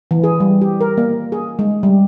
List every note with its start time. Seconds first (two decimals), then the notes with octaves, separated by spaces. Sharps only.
0.11 E3
0.24 G#4
0.40 G3
0.61 G4
0.81 A#4
0.98 A#3
1.32 G#4
1.59 G#3
1.83 G3